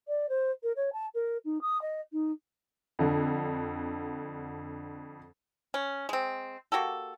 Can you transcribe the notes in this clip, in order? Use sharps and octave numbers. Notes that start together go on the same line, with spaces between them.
D5
C5
A#4
C#5
A5
A#4
D#4
D#6
D#5
D#4
F2 D3
C#4
G#3 C4
A#3 F#4 G4 A4